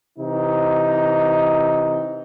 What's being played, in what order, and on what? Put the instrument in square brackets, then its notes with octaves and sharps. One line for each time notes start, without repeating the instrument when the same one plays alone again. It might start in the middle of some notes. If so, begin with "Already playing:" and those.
[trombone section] C3 E3 D#4